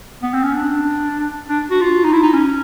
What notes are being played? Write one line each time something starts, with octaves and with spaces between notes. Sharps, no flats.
B3
C4
C#4
D4
D4
F#4
F4
D#4
E4
D#4
C#4